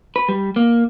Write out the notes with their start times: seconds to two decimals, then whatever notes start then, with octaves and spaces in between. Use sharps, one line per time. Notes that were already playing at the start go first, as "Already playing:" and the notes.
0.16 B4
0.28 G3
0.56 A#3